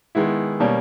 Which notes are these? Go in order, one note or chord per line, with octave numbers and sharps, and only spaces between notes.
D#3 G#3 B3 E4
B2 G3 A#3 C#4